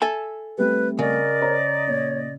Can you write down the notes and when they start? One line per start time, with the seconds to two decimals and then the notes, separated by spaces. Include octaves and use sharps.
0.02 A4 E5 G#5
0.58 G3 A3 C4 B4
0.99 C#3 A#4 D5 D#5
1.41 C5 C#5 A#5
1.87 A#2 C#5